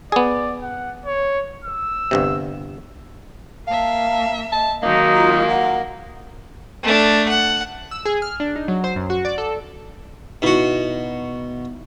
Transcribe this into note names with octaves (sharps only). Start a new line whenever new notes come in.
B3 G#4 D5
F#5
C#5
E6
G1 G2 C3
A#3 E5 F5 A5
D#5 A5
D#3 F#3 G#3 A#3 D#4
F4
F#5
A3 D4
F#5
E6
G#4
F6
D4
D#4
F#3
C5
F#2
F#4
D5
A4
B2 D#4 E4 F#4